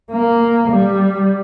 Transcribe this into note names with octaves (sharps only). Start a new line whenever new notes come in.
A#3
G3